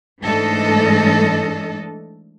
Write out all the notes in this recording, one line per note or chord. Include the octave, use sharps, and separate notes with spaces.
G#2 E3 A3 D4 A4 D#5